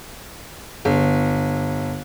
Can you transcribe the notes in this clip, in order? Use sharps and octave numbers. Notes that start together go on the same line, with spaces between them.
G1